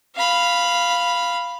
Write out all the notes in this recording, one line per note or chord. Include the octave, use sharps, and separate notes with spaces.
F5 B5